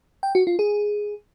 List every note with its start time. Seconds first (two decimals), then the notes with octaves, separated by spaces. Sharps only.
0.23 G5
0.35 F#4
0.47 F4
0.59 G#4